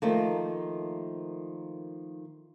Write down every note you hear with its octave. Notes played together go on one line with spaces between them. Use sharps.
D#3 F3 A3 A#3